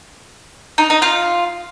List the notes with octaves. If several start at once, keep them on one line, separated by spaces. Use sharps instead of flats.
D#4
D#4
F4